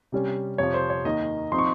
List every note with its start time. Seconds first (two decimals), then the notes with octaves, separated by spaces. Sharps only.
0.12 C3 G3 C#4
0.58 F2 C3 F3 C#5
0.74 C5
0.90 C#5
1.05 D#2 D#3 A#3 D#4 D#5
1.52 F3 C4 D#4 C6
1.58 C#6